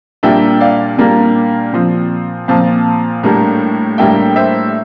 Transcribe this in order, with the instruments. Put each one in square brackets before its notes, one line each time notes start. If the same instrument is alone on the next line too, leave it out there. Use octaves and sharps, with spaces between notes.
[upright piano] A#2 G3 A#3 D4 E5 G5
D5 F5
A#2 G3 A#3 D4
A#2 F3 C4
A#2 F3 C4 F5 A5
A2 G3 A#3 D4
A2 G3 A#3 D4 E5 G5
C5 E5